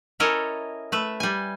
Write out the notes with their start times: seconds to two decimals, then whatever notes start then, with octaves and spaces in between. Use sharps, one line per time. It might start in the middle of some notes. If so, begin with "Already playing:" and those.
0.20 C#4 E4 A4 A#4 C#5 D#5
0.92 A3 B4 E5
1.20 G3 G#5